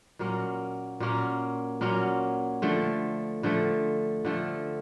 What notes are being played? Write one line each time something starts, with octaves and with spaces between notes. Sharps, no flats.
A#2 F#3 A#3 C#4
A#2 F#3 A#3 C#4
A#2 F#3 A#3 C#4
D3 F3 A3
D3 F3 A3
D3 F3 A3